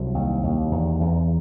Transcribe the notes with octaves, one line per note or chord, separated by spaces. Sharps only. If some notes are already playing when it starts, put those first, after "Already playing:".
Already playing: C2 F#3
D#2
D#2
E2
E2